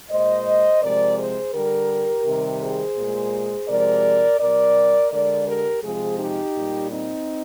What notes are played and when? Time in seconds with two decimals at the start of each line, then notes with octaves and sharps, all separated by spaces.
0.10 A#2 G#3 C5 D#5
0.81 C3 F3 G#3 A#4 D5
1.18 G#4 C5
1.53 D3 G3 G4 A#4
2.25 C3 D#3 G3
2.61 G#4 C5
2.96 A#2 G#3
3.68 C3 F3 G#3 A#4 D5
4.39 C3 G3 A#4 D5
5.11 D3 G#3 A#4 D5
5.47 G4 A#4
5.83 C3 F3 G#3 F4 G#4
6.19 D#4 G4
6.54 A#2 G3
6.90 C4 D#4